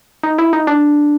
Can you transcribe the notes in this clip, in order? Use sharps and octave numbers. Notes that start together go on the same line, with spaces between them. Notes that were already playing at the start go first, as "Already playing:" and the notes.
D#4
E4
D#4
D4